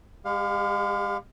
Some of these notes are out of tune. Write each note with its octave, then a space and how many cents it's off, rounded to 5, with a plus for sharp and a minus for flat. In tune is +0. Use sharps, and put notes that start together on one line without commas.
G#3 -30 G4 +25 F5 +20